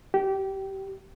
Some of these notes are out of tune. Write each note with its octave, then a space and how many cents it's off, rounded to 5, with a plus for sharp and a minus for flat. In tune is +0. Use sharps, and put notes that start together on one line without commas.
G4 -20